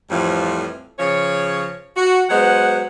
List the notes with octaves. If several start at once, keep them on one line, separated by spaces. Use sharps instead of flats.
F2 A2 E3 F3 G3
C#3 F3 C#5
F#4
F#3 G#3 B3 C5 F#5